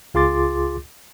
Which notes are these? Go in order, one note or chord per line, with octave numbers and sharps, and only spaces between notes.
C#2 F4 G#4 C6 D6 A6